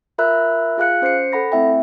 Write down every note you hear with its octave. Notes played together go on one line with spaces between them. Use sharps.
F4 A#4 E5 B5 E6 F#6
F4 G#4 F5 F#6 C#7
C#4 C5 G6 C7 C#7
A4 F#5 B5 A#6
A3 C4 E4 E5 G5